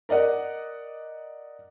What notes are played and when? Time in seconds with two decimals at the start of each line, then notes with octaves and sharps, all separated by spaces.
0.09 A#4 D5 D#5 F#5